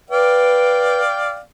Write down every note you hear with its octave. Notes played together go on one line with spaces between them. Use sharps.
B4 D5 F5 G5